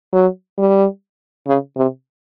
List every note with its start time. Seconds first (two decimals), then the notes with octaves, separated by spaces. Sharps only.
0.13 F#3
0.58 G3
1.47 C#3
1.77 C3